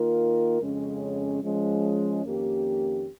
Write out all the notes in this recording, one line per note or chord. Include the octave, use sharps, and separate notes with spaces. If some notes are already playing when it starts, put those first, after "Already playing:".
Already playing: D#3 A#3 F4 A#4
F2 C#3 G#3 C#4
F3 G#3 C#4
F2 D#3 A#3 C#4 G4